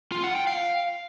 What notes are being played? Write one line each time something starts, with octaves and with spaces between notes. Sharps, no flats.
F4
F#5
G5
F5